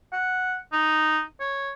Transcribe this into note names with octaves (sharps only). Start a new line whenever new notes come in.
F#5
D#4
C#5